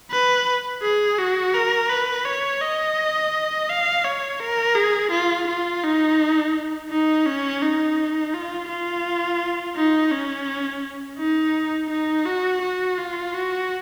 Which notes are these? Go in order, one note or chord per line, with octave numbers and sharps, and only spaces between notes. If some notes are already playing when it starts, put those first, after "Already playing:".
B4
G#4
F#4
A#4
B4
C#5
D#5
F5
C#5
A#4
G#4
F4
F4
D#4
D#4
C#4
D#4
F4
F4
D#4
C#4
D#4
D#4
F#4
F#4
F4
F#4